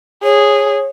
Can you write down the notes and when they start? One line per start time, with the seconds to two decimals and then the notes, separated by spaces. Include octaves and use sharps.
0.23 G#4 C#5